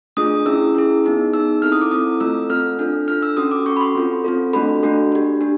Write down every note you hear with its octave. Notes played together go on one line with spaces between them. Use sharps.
A3 D4 F4 G#4 D#6
C#4 E4 G#4 E6
C#4 E4 G#4
B3 D#4 G#4
B3 D#4 G#4 E6
C4 E4 A4 F6
D#6
D6
C4 E4 A4 D#6
A3 C4 F4 A4 E6
A3 C4 F4 A4 F6
D4 F4 A4
D4 F4 A4 F6
E6
C#4 F#4 A4 D#6
D6
C#4 F#4 A4 C#6
B5
C6
C4 F4 A4
C4 F4 A4
A3 D4 F#4 A4 B5
A3 D4 F#4 A4
D4 G4
D4 G4